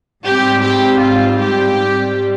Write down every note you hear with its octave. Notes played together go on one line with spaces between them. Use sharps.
G#2 G3 C4 G4
G4
F4
G4
G#2 G3 C4